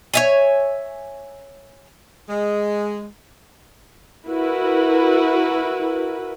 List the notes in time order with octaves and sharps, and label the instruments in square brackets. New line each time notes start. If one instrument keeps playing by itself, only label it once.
[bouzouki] C#5 E5 G#5
[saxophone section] G#3
[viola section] E4 F#4 A#4 B4